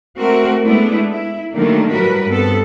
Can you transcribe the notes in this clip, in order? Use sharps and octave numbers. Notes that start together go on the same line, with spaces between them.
A3 C4 F#4 A#4
G#3 A3 B3 D4 E4
E4
D3 D#3 F#3 G3 A3 A#3
A2 F#3 G3 F#4 A#4 B4
G2 G3 B3 C4 A4